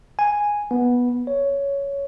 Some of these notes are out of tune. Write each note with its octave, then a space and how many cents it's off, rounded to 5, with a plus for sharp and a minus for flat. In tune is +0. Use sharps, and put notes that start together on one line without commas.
G#5 -5
B3 -10
C#5 +10